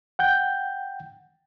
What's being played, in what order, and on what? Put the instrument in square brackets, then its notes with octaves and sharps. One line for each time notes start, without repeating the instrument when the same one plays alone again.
[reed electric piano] F#5 G5 G6